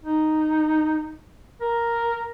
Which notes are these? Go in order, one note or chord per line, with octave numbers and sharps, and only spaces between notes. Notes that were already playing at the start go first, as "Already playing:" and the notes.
D#4
A#4